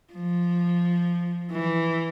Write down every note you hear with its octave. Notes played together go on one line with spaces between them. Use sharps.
F3
E3